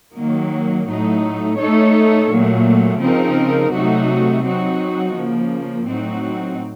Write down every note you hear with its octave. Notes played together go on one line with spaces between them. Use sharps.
D#3 F#3 A#3
A2 F#3 A3 D#4
A3 D#4 A4 C#5
A#2 F#3 A3
C#3 F3 C4 D#4 A#4
C3 F#3 A3 D#4 F#4
F#3 C4 D#4 F#4
C#3 F3 A#3
A2 F#3 C4 D#4 F#4